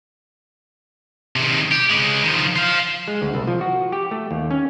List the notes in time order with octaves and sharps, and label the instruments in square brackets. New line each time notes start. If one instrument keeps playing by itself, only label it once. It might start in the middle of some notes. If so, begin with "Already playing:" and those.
[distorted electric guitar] C3 D#3
G4
C#3 G#3
D#3 F3
C5 F5
[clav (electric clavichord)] G#3
D2
C2
F3
F#4
G4
A3
D#2
C#4